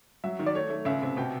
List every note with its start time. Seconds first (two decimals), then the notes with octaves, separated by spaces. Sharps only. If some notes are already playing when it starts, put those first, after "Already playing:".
0.24 F#3 E5
0.39 D#3
0.46 D5
0.55 A3 C#5
0.70 A3
0.85 C#2 E5
1.02 C3
1.17 B2 G5